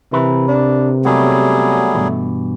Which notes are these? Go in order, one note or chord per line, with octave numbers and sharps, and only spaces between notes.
C3 E3 A#4 B4
D4
F#3 G3 A3 B3 C#4 G#4
G2 B2 E3